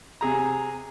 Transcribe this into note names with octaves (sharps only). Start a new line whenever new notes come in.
C3 G#4 A#5